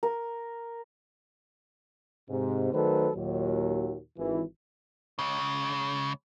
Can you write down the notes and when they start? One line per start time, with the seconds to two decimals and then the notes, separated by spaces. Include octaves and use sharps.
0.03 A#4
2.29 G#2 C3
2.72 D#3 F#3 A3 A4 B4 C5
3.15 D#2 A#2 F#3
4.18 G#1 E3
5.19 C#2 C#3